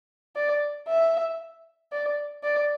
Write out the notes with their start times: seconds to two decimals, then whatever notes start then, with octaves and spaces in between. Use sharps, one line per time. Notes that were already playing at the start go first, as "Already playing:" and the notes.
0.36 D5
0.88 E5
1.92 D5
2.43 D5